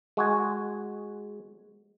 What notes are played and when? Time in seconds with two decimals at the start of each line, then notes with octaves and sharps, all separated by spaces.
0.17 G#3 F#4 G#5